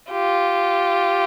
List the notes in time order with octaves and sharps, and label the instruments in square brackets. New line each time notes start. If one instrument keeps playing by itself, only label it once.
[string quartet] F4 G4